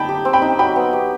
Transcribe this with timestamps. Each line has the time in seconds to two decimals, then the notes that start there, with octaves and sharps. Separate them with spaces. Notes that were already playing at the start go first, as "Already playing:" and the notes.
Already playing: G3 D#4 G5 A5 B5
0.09 G4
0.25 C4
0.33 G5 B5
0.42 D#4
0.59 F#3 G5 B5
0.76 B3
0.93 G4